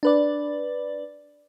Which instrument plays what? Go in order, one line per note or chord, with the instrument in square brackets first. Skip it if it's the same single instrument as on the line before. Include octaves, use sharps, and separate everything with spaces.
[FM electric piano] D4 B4 D5